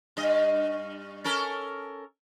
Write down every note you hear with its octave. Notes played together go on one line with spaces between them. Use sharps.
G2 D#5
C#4 A4 A#4